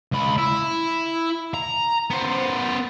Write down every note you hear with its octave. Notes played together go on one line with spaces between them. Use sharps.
C#2 B5
E4
A#5
B3 C5